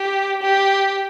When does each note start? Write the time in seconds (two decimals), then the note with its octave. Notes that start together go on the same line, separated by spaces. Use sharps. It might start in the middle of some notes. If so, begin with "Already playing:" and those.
Already playing: G4
0.42 G4